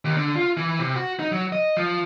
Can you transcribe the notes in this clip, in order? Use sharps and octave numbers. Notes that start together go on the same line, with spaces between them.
D#2
D3
F4
E3
C3
F#4
D#4
F#3
D#5
F3